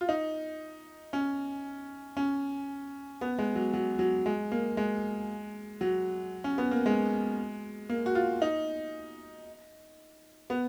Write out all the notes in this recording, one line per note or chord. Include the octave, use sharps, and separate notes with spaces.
F4
D#4
C#4
C#4
B3
G#3
F#3
F#3
F#3
G#3
A#3
G#3
F#3
C#4
B3
A#3
G#3
A#3
F#4
F4
D#4
B3